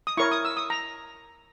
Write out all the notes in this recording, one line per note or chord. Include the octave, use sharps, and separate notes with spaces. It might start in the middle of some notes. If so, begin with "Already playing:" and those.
D#6
E4 A#4 C#5 C#6
D#6
E6
D#6
A#5